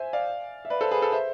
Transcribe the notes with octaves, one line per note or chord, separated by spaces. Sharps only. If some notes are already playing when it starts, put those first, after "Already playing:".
Already playing: C5 E5 G#5
D5 F5
E5
B4 D5
A4 C5
G#4 B4
A4 C5
C5 E5